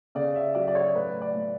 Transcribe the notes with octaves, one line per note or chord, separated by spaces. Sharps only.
C#3 D5
E5
F#3 D5
D5
C#5
A2 B4
D5
A2